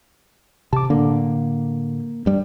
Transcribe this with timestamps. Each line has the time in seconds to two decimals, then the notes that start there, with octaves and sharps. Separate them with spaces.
0.73 C3 A5 D6
0.90 A2 D3 A#3
2.26 G2 G3